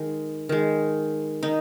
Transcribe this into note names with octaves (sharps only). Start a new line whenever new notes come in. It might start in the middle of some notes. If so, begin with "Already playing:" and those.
Already playing: D#3 G#3
D#3 G#3
D#3 D#4